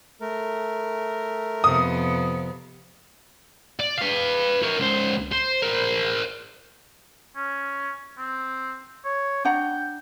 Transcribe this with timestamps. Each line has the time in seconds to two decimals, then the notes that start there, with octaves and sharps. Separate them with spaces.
0.21 A3 A#4
1.64 F2 C3 B3 D#6
3.80 D5
3.98 B4 F5
4.63 A#4 C#5
4.80 C#2 C5
5.32 C5
5.62 A#4 C5
7.36 C#4
8.18 C4
9.05 C#5
9.45 D4 F#5 G5 A#5